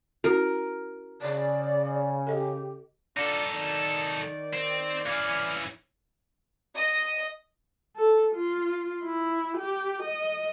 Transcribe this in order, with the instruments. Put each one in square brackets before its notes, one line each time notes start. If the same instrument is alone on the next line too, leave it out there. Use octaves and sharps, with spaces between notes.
[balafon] C#4 E4 F#4 [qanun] A#4
[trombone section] C#3 [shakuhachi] D5
[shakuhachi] G4 [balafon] A4 D#5
[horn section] D4 F4 [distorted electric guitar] D#4 A4
[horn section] D#3 D5
[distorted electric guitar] C4
[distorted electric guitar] E3 C#4 [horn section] D5 F5
[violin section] D#5
[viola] A4
F4
E4
G4
D#5